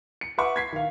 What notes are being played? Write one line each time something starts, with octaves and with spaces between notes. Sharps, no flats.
C#7
B4 E5 F#5 C#6 D6
G#6 B6 C7
D#3 F5